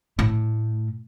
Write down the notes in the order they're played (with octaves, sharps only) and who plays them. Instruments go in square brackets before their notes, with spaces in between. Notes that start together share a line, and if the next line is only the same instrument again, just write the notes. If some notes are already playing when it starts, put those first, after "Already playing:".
[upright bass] A2